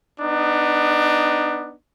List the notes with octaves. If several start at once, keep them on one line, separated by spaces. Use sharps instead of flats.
B3 D4 D#4